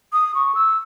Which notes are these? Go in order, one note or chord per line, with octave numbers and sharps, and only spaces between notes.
D#6
C#6
E6